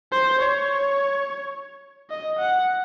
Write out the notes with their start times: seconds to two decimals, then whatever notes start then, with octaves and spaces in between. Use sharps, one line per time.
0.12 C5
0.41 C#5
2.11 D#5
2.39 F#5